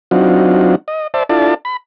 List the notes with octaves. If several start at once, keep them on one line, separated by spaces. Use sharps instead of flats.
F#3 C4 D4 D#4 F4 F#4
D#5
C5 D5 E5 A5
D4 E4 F4 A4 D5 A5
B5